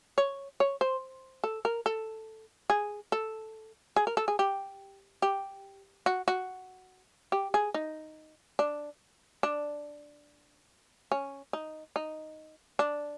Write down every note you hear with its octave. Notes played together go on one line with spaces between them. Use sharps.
C#5
C#5
C5
A4
A#4
A4
G#4
A4
G#4
A#4
A4
G#4
G4
G4
F#4
F#4
G4
G#4
D#4
D4
D4
C#4
D#4
D#4
D4